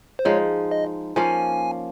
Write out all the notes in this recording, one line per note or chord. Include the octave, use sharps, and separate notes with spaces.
C5
F3 G#3 D#4 C#5
D#5
F3 A#3 C#4 G#5